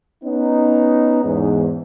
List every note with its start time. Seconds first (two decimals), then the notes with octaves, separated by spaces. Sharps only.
0.24 B3 C#4 D#4
1.24 E2 G#2